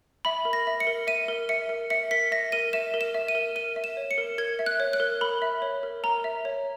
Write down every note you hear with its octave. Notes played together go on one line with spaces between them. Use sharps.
E5 B5
A#4
A#6
E5
C#7
A#4
E5 D#7
A#4
E5 C#7
A#4
E5 C#7
A#4 B6
E5 A#6
A#4 D#7
E5 E7
A#4
E7
E5
D#7
A#4
A#4 D#7
E5
E7
C#5
C#7
A#4
A#4 G#6
E5
F#6
C#5
F#6
A#4
A#4 B5
E5
C#5
A#4
A#4 A#5
E5
C#5